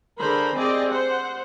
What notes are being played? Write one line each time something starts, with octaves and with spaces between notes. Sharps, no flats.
D3 G#4 A#4 C5 B5
C4 G4 G#4 D5 D#5
C5 F#5